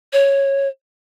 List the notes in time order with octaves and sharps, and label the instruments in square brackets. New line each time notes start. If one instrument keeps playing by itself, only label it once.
[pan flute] C#5